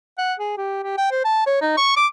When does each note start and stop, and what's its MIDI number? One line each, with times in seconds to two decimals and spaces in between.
0.18 0.34 78
0.39 0.55 68
0.57 0.82 67
0.83 0.95 67
0.98 1.07 79
1.11 1.22 72
1.24 1.44 81
1.46 1.61 73
1.61 1.75 63
1.77 1.96 85
1.96 2.06 86